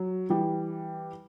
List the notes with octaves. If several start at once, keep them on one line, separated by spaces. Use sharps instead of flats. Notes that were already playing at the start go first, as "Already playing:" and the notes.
Already playing: F#3
E3 G3